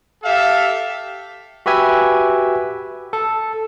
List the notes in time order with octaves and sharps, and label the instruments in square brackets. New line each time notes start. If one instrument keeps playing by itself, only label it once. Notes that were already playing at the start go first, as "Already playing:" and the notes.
[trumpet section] G4 A4 E5 F5
[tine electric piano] F#4 G4 B4 E5 G#5
A4